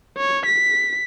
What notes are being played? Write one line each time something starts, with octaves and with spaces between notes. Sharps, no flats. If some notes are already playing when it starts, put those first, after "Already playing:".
C#5
B6